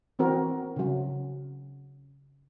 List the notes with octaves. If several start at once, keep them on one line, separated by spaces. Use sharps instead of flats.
E3 C4 F#4 A#4
C#3 F#3